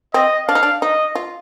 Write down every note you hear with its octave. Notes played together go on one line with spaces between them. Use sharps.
C4 D#5
D4 F5
D#4
D4
D#4 D#5
F4